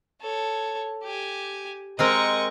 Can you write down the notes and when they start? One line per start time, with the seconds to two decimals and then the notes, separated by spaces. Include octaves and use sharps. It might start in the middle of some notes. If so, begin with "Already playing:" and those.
0.21 A4 C#5
1.03 G4 G#5
1.99 G#3 C4 A#4 D#5 C#6